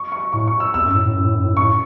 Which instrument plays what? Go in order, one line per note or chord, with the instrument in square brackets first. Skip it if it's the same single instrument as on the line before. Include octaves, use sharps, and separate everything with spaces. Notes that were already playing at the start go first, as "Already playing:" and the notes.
Already playing: [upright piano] C#6
C#6
[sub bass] A2 [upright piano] C#6
[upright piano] C#6
E6
[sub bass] E2 [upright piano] E6
[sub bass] F#2
A2
A2
F#2
A2
F#2
A2
[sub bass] F#2 [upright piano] C#6
[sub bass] A2